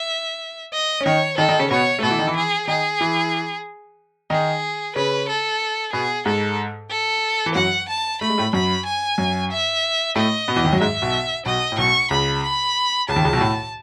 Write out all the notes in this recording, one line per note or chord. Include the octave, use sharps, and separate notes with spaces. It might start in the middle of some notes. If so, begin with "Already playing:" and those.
Already playing: E5
D#5
C#4
D#3 D#4 C#5
D#3 D#4 A4
D#3 D#4
C#3 C#4
B2 B3 C#5
A3
B2 B3 A4
E3 E4
D#3 D#4
E3 E4
G#4
D#3 D#4 G#4
E3 E4
D#3 D#4 G#4
C#3 C#4 B4
A4
B2 B3 G#4
G#2 G#3 A4
A4
E3
F#2 F#3 F#5
A5
A3 B5
G#3
A2 A3
F#2 F#3 B5
G#5
F#2 F#3
E5
A2 A3 D#5
B2 B3
E2 E3
D#2 D#3
F#2 F#3
G#2 G#3 E5
B1 B2
B1 B2 D#5
A2
B1 B2 C#6
C#2 C#3 B5
B5
C#2 C#3 A5
D#2 D#3
C#2 C#3
B1 B2
A2